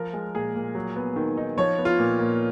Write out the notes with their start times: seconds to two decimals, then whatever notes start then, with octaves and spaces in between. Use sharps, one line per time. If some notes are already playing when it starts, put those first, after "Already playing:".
Already playing: F3 A#4
0.13 G#3
0.34 A#2 G#4
0.55 A#2
0.75 F#3
0.96 B3
1.16 D#3
1.37 D#4
1.57 F3 C#5
1.78 B3
1.85 F4
1.99 A#2
2.19 A#2